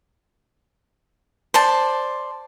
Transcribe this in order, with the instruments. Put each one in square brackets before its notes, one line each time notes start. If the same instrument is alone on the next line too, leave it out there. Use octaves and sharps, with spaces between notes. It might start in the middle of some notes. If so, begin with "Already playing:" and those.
[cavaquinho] C5 D5 A5